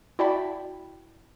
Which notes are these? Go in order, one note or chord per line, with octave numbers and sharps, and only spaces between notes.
E4 F#4 D5 G5 A5 B5